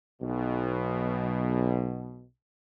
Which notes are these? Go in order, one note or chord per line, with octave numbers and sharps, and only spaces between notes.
B1 B2